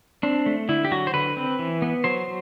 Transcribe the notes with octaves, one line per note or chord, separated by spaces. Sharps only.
C4 D4
A3
D3 E4
G4
F#3 F#4
C5
D3 B4
C4
E3
B3
F#3 C5